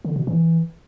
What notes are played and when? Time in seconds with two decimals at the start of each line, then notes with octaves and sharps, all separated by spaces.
0.05 D3
0.16 B2
0.27 E3